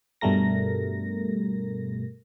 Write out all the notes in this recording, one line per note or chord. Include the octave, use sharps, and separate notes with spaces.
G2 B2 G3 A3 A#4 A#6